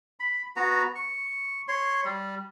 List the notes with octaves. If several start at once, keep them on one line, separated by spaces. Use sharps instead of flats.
B5
B3 F#4 A#5
C#6
C#5 C6
G3